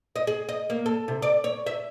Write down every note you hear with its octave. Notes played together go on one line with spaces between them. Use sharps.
D#5
G#4
D#5
A#3
A4
C3
D5
C#5
E5